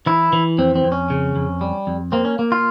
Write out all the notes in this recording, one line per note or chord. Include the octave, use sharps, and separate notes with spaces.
E3 E4
E3
F2 C4
C4
F2
C#4
C#3
F2
G3
F2
A#3 C4
C#4
A#3
F4